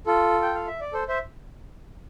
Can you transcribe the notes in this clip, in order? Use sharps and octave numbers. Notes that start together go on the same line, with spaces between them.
F4 A4
G5
F5
E5
D5
A4 C5
C5 E5